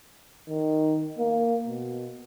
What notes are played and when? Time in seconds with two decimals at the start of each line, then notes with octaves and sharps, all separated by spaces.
0.49 D#3
1.19 A#3
1.67 B2